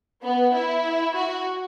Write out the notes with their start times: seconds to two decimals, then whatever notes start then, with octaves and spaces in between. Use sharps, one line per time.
0.23 B3
0.54 E4
1.15 F#4